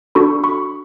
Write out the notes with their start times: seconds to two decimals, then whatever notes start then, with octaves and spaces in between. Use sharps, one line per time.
0.15 D4 F#4 A4 B5 C#6
0.44 B5 C#6